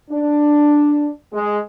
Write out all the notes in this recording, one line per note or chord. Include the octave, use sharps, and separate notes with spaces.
D4
G#3